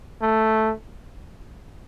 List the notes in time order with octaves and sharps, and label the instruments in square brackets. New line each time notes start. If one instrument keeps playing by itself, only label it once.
[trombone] A3